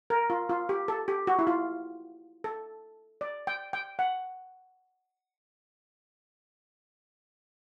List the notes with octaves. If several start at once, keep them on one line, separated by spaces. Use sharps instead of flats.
A#4
F4
F4
G4
A4
G4
F#4
E4
F4
A4
D5
G5
G5
F#5